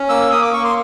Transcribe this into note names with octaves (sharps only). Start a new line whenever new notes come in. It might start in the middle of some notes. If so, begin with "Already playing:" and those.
Already playing: C#4
A#3 E6
A#3 D#6
D6
A#3 C#6
C6